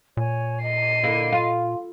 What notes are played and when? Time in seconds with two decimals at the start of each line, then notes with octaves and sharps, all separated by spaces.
0.17 A#2 C#5 G#5
0.63 D#5 C7 D#7
1.03 D3 A#3 E4
1.32 F4